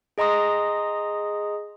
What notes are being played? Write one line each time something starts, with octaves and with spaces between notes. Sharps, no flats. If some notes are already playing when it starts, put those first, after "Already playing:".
G#4 D#5 A#5 C6 D#6